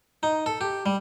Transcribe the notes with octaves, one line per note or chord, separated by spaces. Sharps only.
D#4
A4
G4
G3